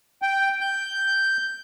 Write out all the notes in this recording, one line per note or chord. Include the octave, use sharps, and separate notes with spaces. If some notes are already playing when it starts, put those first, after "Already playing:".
G5
G6